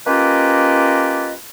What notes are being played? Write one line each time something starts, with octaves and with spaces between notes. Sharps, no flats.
A#3 C#4 F4 G4 B4 D#5